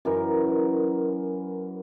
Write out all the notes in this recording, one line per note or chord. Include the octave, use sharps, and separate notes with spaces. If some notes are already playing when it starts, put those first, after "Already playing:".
F#2 E3 A#4